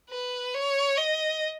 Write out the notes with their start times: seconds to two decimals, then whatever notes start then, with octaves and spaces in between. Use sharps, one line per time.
0.10 B4
0.54 C#5
0.98 D#5